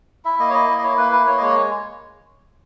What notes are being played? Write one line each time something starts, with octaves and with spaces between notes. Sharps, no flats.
E4 E5
A#3 D#5
C#5
E4 D#5
A#3
D#5
E4 C#5
A#3 B4
E4 B4
A#3 C#5
D#5
G#3 C#5